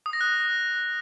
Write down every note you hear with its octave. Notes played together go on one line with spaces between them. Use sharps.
D#6
A#6
F#6